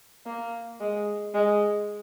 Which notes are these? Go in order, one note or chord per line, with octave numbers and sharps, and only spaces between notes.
A#3
G#3
G#3